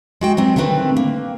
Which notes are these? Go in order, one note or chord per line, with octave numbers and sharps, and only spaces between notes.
G#3 F#4 G5
F#3 B3 C4
D3 D#3 A3 C4 B4
A#3